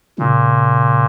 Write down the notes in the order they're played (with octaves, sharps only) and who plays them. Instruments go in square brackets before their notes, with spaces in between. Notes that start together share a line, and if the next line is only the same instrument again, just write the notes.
[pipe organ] A#2 [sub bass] C#3